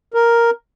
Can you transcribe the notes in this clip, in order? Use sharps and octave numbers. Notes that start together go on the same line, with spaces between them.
A#4